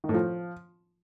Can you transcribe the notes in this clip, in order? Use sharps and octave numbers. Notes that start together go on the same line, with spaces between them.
D#3
A2
F3